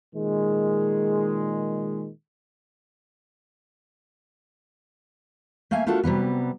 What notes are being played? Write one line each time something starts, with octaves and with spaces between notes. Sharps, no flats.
A#2 D#3 G#3
A3 A#3 E5 F5 G#5
A3 D4 F4 F#4 A4 A#4
C3 F#3 G3 B3